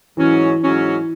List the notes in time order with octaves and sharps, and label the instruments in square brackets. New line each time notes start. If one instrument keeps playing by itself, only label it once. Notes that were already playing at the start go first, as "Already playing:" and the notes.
[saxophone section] G#2 F#3 C#4 [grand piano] E3
[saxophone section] G#2 F#3 C#4